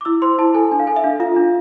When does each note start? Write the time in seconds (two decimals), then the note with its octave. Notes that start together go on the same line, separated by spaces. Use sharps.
0.01 D6
0.05 E4 E6
0.22 C5 C6
0.38 E4 A5
0.54 A4 G#5
0.71 D4 G#5
0.80 F5
0.87 A4 G#5
0.96 E5
1.04 D4 F5
1.20 F4 F5
1.36 D4